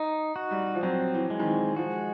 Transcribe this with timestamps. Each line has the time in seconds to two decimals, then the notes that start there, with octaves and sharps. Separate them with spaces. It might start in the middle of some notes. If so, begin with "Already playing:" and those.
Already playing: D#4
0.36 F#4
0.51 G3
0.75 F3
0.83 F#3 C4
1.14 E3
1.30 G#3
1.40 D#3
1.46 E3
1.76 F3 F#4